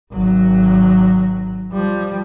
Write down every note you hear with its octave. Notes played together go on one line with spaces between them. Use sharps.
G#1 F#3
F3 G3